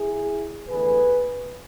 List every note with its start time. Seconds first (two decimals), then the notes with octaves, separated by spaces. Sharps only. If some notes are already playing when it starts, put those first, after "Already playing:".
Already playing: E4 G#4
0.68 E2 D3 A3 G#4 B4